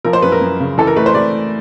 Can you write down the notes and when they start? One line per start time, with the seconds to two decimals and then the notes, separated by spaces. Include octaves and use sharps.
0.05 F3 A#4
0.13 C5
0.22 F#2 B4
0.32 A#4
0.41 F#2
0.60 C#3
0.78 E3 A4
0.87 A#4
0.96 A3 B4
1.06 C5
1.14 A3 D5